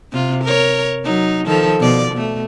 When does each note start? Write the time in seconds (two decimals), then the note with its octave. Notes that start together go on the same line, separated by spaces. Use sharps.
0.12 C3 F4
0.44 A#4 C#5
1.04 F#3 D#4
1.46 D#3 F3 A4
1.80 B2 F3 D5
2.12 B2 A3